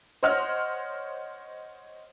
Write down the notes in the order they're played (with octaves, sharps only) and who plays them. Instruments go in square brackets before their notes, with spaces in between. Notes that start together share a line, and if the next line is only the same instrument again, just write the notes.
[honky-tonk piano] C5 C#5 D#5 F#5 F6